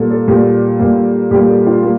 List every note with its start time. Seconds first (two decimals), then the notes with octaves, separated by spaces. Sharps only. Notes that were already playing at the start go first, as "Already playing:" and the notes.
Already playing: A#2 G3 A#3 A4
0.10 A4
0.27 A#2 G3 A#3 G4
0.79 A#2 G3 A#3
1.31 A#2 G3 A#3 G4
1.48 A4
1.67 F4
1.83 G3 A#3